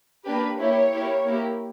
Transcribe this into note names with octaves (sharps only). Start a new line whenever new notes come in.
A#3 D4 G4 B4
A#3 E4 G4 C#5
A#3 E4 G4
A#3 E4 G4